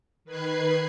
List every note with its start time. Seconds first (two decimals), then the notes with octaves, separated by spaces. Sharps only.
0.25 D#3 B4 F#6 G#6 C7